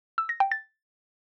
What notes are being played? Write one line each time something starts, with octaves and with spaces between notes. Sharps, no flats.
E6
A#6
G5
A6